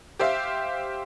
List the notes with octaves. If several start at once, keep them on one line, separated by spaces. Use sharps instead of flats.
G4 C5 E5 F5